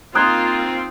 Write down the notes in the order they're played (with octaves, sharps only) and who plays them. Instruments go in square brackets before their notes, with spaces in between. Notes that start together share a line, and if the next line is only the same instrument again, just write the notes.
[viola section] A#3 F4 [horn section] C4 [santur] D#4 C6 [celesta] D#6 F#6 G#6